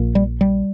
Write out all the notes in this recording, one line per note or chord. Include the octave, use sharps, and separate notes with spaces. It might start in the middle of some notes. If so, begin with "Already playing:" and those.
Already playing: A#1 A#2
G3
G3